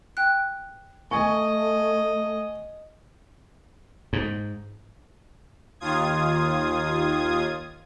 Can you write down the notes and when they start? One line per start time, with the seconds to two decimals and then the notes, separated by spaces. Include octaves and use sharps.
0.17 G5 F#6
1.11 A3 D#5 G#5 C#6
4.13 G#2
5.80 D#2 F4 D#6 G#6